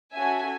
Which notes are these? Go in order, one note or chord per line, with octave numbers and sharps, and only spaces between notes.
C#4 F#4 A4 E5 G#5